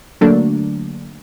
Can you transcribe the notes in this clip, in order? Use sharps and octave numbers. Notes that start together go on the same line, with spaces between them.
D3 F#3 A3 A#3 D4